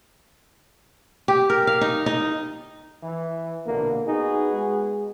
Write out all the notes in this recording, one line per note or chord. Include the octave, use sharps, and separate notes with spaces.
G4
A#4
F5
D#4
D#4
E3
A#1 B2 D3 A#3
B3 D#4 F#4 G#4
G#3